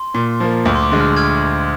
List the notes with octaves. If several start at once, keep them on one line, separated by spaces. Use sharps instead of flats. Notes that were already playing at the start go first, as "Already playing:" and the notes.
Already playing: C6
A#2
F3 A#3
D2 D6
C6
D6
D3 G#3
F6
F6 G#6